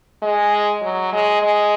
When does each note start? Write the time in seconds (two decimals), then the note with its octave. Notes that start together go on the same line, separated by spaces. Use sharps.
0.22 G#3
0.82 F#3
1.12 G#3
1.42 G#3